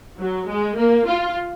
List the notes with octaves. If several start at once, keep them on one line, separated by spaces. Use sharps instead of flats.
F#3
G#3
A#3
F4